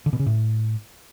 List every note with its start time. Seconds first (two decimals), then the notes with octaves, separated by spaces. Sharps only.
0.06 D3
0.13 B2
0.20 C#3
0.26 A2